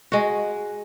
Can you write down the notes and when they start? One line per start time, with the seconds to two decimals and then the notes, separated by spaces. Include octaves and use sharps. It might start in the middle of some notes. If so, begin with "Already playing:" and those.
0.12 G#3 F#4